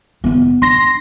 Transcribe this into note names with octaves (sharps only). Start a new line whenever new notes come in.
F#1 B3
D4 C6 A#6